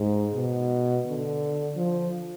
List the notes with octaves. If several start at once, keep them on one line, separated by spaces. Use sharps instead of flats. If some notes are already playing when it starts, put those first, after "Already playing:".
Already playing: G#2
B2
D3
F3